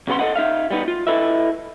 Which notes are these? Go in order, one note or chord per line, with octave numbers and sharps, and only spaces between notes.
B1 C#3 B3 G4 F#5 C6
A4 B4 D#5 F#5
D#4 E5 F5
G3 B3 D#4
F4
E4 A4 B4 D#5 E5